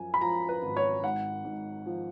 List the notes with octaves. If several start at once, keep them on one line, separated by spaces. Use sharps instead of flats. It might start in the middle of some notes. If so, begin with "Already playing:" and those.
Already playing: F#2 F3 G#5
B5
F3 A#5
B4
G#1
C#5
G#2 F#5
G#2
F3